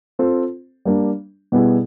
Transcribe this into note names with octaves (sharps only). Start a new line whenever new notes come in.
C4 F4 A4 C5
G3 A#3 D4
B2 G3 B3 E4 G#4